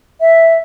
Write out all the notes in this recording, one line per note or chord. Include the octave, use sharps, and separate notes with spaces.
E5